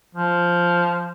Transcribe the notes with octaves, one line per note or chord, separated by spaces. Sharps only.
F3